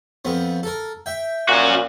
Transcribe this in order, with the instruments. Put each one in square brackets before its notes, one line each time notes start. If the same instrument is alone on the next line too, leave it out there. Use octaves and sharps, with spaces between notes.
[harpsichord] F2 B3 C4
A4 A#4
E5 G5
[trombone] A#2 [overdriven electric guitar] C#4 F#4